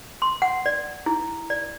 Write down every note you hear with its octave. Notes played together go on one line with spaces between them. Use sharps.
C6
F#5
D5
E4
D5